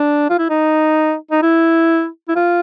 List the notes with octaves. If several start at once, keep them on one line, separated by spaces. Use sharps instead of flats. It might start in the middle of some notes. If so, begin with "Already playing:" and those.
Already playing: D4
F4
E4
D#4
D#4
E4
E4
F4